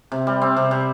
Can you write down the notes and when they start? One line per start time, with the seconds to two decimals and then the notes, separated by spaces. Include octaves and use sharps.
0.12 C3
0.27 G3
0.41 C4
0.56 C3
0.71 C3